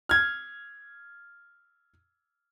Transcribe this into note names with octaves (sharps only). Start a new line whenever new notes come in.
F6 G#6